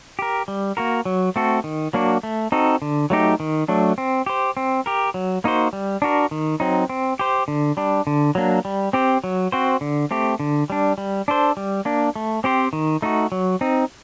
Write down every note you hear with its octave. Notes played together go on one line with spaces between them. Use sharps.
G4 A#4
G3
A#3 F#4 A#4
F#3
A3 C4 F#4 A4
D#3
F#3 A#3 D4 F#4
A3
C4 D#4 F#4 A4
D3
F#3 A3 D#4 G4
D#3
F#3 A3 D4
C4
G4 C5
C4
G4 A#4
F#3
A#3 D#4 F#4 C5
G3
D4 F#4 A#4
D#3
F#3 C4 D#4
C4
G4 C5
D3
G3 D4
D3
F#3 A#3 D4
G3
C4 G4 C5
F#3
C4 F#4 C5
D3
A3 C4 G4
D3
G3 D4
G3
D4 A4 C5
G3
A#3 D4
A3
C4 G4 C5
D#3
A3 D#4 F#4
F#3
C4 D#4